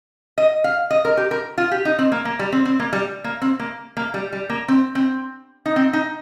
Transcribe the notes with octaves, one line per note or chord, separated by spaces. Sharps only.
D#5
F5
D#5
A#4
G4
A#4
F4
G4
D#4
C4
A#3
A#3
G3
C4
C4
A#3
G3
A#3
C4
A#3
A#3
G3
G3
A#3
C4
C4
D#4
C4
D#4